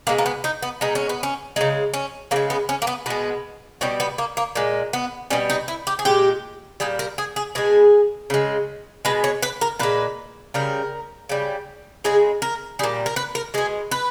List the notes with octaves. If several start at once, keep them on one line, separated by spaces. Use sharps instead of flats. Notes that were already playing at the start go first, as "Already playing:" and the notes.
B2 G#3 A#3
A#3
B3
D#4
B3
B2 G#3 D#4
C#4
B3
C#4
C#3 G#3 D#4
C#4
C#3 G#3 A#3
B3
C#4
A#3
B3
B2 G#3 B3
B2 G3 C#4
B3
A#3
A#3
A#2 G#3
B3
B2 G3 C#4
D#4
E4
G4
G#4
A#2 G#3 G4
A#2 G3 G#4
A#4
G#4
G#4
B2 G#3 G#4
C#3 G#3
B2 G#3 B4
C#5
B4
A#4
A#2 G#3 B4
C#3 G3 A#4
C#3 G3
C#3 G#3 G#4
A#4
A#2 G3 G#4
A#4
B4
A#4
B2 G#3 G#4
B4